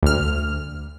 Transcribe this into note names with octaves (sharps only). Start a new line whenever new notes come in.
D2 F6